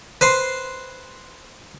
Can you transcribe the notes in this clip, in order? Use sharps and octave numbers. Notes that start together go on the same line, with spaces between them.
B4 C5 C6